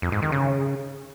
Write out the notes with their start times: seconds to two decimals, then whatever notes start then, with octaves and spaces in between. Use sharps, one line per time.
0.02 F2
0.12 G#2
0.22 D#3
0.32 C#3